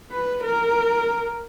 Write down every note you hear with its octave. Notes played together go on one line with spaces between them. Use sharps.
B4
A#4